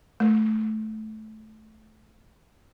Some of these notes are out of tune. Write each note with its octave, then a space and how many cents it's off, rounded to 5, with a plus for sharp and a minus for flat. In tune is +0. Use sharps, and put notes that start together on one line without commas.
A3 -15